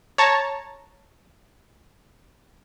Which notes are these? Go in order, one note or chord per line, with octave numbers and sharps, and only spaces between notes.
C#5 A5 A#5